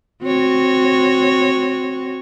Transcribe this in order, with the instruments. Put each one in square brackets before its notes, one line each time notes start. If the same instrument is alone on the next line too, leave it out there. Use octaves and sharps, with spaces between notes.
[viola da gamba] C4 F#4 C#5